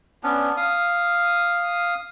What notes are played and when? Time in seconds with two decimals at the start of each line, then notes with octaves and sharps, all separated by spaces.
0.23 B3 C#4 D4
0.57 F5 D#6